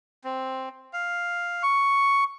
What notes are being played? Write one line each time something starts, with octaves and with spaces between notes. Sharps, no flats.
C4
F5
C#6